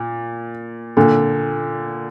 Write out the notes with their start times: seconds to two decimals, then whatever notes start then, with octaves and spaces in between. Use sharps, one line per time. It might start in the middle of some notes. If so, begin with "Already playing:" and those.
Already playing: A#2
0.97 A#2 D3